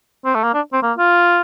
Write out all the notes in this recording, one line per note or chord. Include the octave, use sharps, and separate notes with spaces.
C4
A3
A#3
D4
C4
A#3
F4